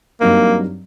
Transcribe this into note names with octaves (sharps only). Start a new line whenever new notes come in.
G2 F#3 A#3 C4 D#4